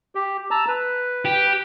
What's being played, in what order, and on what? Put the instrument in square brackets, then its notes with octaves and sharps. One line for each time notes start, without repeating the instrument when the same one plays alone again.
[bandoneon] G4
A5 A#5 E6
B4
[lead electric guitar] G4